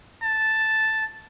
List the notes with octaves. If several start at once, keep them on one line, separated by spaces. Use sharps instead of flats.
A5